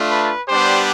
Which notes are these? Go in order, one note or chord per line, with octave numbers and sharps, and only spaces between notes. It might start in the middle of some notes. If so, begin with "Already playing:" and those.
Already playing: A3 D4 F4
B4
G3 B3 D4 G4 C5